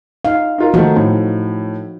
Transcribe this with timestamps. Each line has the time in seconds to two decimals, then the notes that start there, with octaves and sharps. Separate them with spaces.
0.25 D#4 F5
0.58 D#4 F4 A#4
0.74 D#3 F3 A3 D#4 F#4
0.96 A2